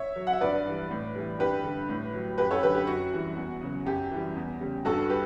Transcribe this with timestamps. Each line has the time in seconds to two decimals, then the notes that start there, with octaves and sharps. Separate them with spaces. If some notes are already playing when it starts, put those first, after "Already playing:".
Already playing: C#5 E5
0.16 F#3
0.27 F#5
0.33 E5
0.41 G2 B4 D5
0.65 E3 G3
0.91 A2
1.15 E3 G3
1.39 G2 G4 B4
1.64 D3 G3
1.89 A2
2.13 F#3
2.38 F#2 G4 B4
2.51 A4 C#5
2.63 D3 F#3 G4 B4
2.75 G4
2.87 F#2 F#4
3.13 E3 G3
3.37 E2
3.61 C#3 F#3
3.86 F#2 G4
4.11 E3 G3
4.36 E2
4.61 C#3 G3
4.85 G2 F#4 A4
5.10 G3 G4 B4